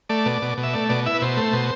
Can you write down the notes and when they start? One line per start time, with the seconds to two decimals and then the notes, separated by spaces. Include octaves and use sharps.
0.09 A3 D5
0.26 B2
0.42 B2
0.58 B2
0.63 E5
0.73 A3 D5
0.89 B2 D5
1.06 E4 E5
1.14 B4
1.22 B2 C5
1.37 A3
1.53 B2